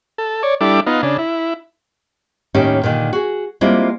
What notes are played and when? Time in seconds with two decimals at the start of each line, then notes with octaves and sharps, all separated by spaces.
0.18 A4
0.43 C#5 D5
0.61 G3 D4 E4 A4 D6
0.86 B3 D#4 F4
1.03 C#3 D4
1.18 E4
2.54 D#2 A2 D#3 C#4 D#4 G4
2.83 A#2 D3 D#3
3.13 F#4 G#4
3.61 G3 G#3 A#3 C4 E4 F4